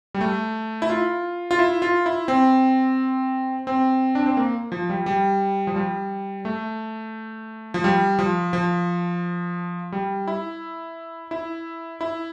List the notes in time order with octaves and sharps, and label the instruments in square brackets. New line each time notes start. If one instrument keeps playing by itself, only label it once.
[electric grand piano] G3
A3
E4
F4
F4
E4
F4
E4
C4
C4
D4
C4
A#3
F3
G3
G3
F3
G3
A3
F3
G3
F3
F3
G3
E4
E4
E4